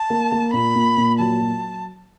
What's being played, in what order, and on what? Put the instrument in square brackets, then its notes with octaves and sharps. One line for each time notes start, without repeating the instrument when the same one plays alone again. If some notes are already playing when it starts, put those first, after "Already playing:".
Already playing: [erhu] A5
[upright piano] A#3
A#3
[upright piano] A#2 [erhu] B5
[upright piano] A#2
A#2
[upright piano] F#3 [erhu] A5
[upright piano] F#3